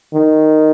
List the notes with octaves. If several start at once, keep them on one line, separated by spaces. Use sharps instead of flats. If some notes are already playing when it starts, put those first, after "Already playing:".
D#3